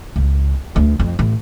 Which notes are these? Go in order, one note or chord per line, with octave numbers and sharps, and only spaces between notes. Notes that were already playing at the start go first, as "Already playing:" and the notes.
C#2
D2
F2
A1